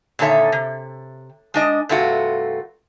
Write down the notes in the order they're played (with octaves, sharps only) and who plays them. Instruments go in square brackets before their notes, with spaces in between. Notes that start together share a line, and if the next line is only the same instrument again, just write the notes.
[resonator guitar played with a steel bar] A#2 D3 D#3 A4 C#5 E5
C3
G#3 D4 D#5
G2 C3 A3 F4 F#4